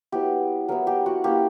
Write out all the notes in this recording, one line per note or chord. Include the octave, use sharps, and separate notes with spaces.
F#3 B3 E4 G4
F#3 B3 E4 A#4
G4
F#4
A#3 C#4 E4 G4